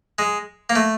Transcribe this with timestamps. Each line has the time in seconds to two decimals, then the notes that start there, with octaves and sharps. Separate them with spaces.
0.19 G#3
0.70 A#3
0.75 A3